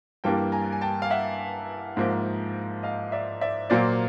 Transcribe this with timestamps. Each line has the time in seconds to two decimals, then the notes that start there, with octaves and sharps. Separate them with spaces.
0.24 G2 E3 G3 A#3 G5 A5
0.52 G#5 A#5
0.72 G#5
0.81 G5 A5
1.02 F5
1.10 E5 F#5
1.97 G#2 F3 A#3
2.83 D#5 F5
3.12 D5 E5
3.41 D5 E5
3.70 A#2 F#3 A#3 C5 D5